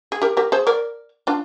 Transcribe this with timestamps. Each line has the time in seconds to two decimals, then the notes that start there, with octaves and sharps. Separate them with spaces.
0.12 G#4
0.22 G4 A#4
0.37 G4 A#4
0.52 G#4 C5
0.67 A#4 D5
1.27 D4 F4